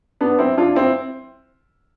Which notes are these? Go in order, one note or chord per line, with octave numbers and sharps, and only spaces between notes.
B3 D4
C4 E4
D4 F4
C4 E4